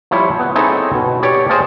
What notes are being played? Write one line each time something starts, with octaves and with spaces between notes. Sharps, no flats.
F3 G3 E4 C#5
B3
C4 D#4 E4 G#4 A4 C#5
B2
G4 C#5 D5
G#4 C5 D5 D#5 F5 A5